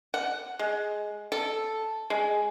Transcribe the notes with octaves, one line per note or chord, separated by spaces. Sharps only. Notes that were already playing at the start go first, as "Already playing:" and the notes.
F#5
G#3
A4
G#3